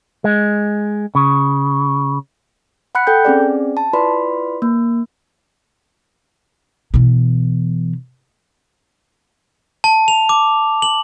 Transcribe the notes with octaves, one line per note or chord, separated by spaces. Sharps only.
G#3
C#3
F#5 B5 F#6 C#7
A4 G5 G6
C4 C#4 G#4 D5
A5
E4 F4 B4 D5 B5 C6
A#3
B2 E3
A5
F7
D6
F#7